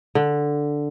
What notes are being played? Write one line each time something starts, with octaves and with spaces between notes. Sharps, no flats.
D3